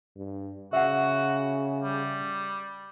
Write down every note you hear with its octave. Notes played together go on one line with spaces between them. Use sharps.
G2
C#3 F#4 E5 F#5
G3